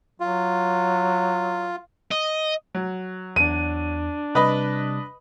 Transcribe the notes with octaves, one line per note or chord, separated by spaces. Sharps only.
F#3 F4
D#5
F#3
E2 D4 D#7
C3 G3 B4 D#5 B5